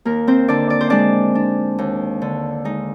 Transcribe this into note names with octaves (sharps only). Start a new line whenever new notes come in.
D#2 A#3 A#4
C4 C5
D3 D4 D5
D5
C5
G#3 D4 D5
D4
D#2
D3
G#3 D#4